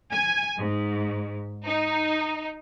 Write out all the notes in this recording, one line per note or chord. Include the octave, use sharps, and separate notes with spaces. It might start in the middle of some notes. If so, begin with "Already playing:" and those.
G#5
G#2
D#4